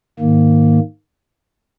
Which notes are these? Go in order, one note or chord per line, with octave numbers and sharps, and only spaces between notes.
G#2 D#3 A#3